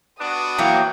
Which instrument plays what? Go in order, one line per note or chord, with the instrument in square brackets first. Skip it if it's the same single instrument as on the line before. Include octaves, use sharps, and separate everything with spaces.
[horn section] B3 D4 F#4 [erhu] D#6
[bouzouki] E3 F#3 A#3 [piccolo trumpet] G5